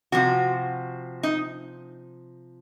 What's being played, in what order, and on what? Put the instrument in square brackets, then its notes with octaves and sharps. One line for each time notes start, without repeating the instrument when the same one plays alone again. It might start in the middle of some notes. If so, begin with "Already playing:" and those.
[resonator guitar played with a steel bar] C3 F3 F#4
D#4